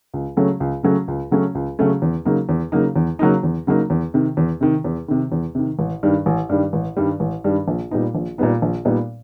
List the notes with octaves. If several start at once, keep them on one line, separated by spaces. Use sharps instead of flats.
C#2
C#3 F#3 A3 C#4
C#2
C#3 F#3 A3 C#4
C#2
C#3 F#3 A3 C#4
C#2
C#3 F#3 A3 C#4
E2
C#3 F#3 A#3 D#4
E2
C#3 F#3 A#3 D#4
E2
C#3 F#3 A#3 D#4
E2
C#3 F#3 A#3 D#4
E2
C3 D#3
E2
C3 D#3
E2
C3 D#3
E2
C3 D#3
A1
G2 D#3 G3
A1
G2 D#3 G3
A1
G2 D#3 G3
A1
G2 D#3 G3
A#1
A#2 G3 B3 D#4
A#1
A#2 G3 B3 D#4
A#1
A#2 G3 B3 D#4